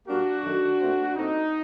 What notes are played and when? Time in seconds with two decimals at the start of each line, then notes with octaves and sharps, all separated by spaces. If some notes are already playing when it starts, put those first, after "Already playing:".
0.08 A#2 G3 A#3 D4 F#4
0.44 F#2 D#3 A3
0.79 A#2 A3 C4
1.15 A#2 A3 C4 D#4